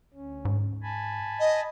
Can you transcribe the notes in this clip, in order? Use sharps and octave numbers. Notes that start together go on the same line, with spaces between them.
D2 C#4
G#2
G#5 A5 B5
D#5